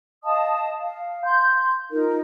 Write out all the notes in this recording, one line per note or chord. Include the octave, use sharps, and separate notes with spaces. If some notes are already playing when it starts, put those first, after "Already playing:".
D#5 F5 A5 D#6
F5
C6 G6
D#4 F4 A#4